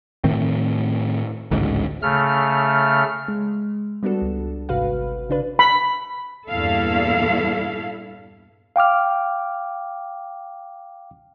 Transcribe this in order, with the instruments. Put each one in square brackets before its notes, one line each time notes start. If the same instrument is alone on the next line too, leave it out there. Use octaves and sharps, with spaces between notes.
[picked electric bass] A2 D#3 A3 C4
A1 D2 G#2 C#3
[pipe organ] C#3 A3 F6
[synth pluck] G#3
G3 B3 D4 F#4 A4
C#2
G#1 G#2 C3 F#4 B4 F5
C#3 D4 B4
[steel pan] B5
[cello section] E2 G2 A#2 E4 A4 F5
[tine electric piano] F5 G5 D6 F6